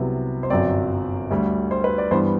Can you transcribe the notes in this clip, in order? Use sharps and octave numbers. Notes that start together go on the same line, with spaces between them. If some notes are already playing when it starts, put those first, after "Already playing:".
Already playing: C2 C3 F#3 B3
C5
G1 F#2 F#3 C4 D5
D2 D3 G3
C5
B4
D5
G2 E3 G3 B3 C5